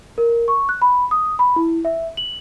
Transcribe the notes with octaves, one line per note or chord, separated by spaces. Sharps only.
A#4
C#6
F#6
B5
D#6
B5
E4
E5
F#7